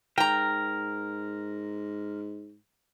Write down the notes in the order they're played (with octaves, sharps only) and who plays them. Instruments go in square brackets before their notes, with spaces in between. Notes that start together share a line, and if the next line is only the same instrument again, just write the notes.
[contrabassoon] G#2 [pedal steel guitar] A#4 [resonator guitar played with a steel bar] G5 A#5